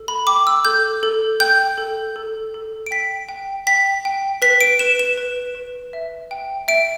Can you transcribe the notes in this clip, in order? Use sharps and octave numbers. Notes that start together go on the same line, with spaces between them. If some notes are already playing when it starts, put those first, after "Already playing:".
Already playing: A4
B5
G5 D6
E6
A4 G6
A4
G5 G6
A4
A4
A4
D7
G5 B6
G5
G5 B6
G5
B4 B6
D7
B4 E7
E7
B4
B4
E5
G5
E5 D7